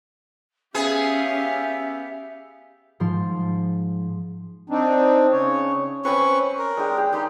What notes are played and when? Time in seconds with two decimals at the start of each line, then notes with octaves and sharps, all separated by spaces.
0.74 B3 C#4 G4 G#4 E5 F5
3.00 G#2 F3 C6
4.70 C4 D4 D#4
5.32 C#3 C#5
6.05 C4 C#4 B4 C5 B5 C#6
6.59 A#4
6.77 G#3 D4 G4
6.97 G4 G#4
7.13 D#4 G4 B5 C6